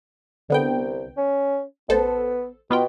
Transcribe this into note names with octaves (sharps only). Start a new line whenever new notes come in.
C2 D3 B3 G5
C#4
A1 B3 A4 C5
B2 B3 F4 G5